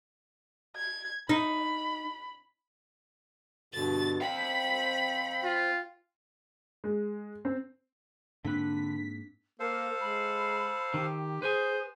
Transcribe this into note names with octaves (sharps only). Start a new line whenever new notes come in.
G#6
D#4 B5
G2 B2 D3 A6
C4 F5 G5 B5
F4
G#3
C4
G#2 D3 A#3 C4 D4 B4 B6
A#3 A4 A#4 C5 F5
G#3 B5
D#3 G4
G#4 B4 C5 G#5